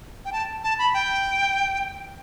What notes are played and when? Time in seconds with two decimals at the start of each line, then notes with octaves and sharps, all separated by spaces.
0.25 G5
0.33 A5
0.64 A5
0.79 B5
0.94 G5